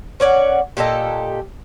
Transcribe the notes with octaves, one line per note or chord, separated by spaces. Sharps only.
C#4 C#5 D5 F#5
A#2 G4 A4 D#5